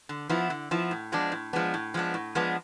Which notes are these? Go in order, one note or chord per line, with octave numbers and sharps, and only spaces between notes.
D3
F3 B3 E4
D3
F3 B3 E4
A2
F3 G#3 B3 D4
A2
F3 G#3 B3 D4
A2
F3 G#3 B3 D4
A2
F3 G#3 B3 D4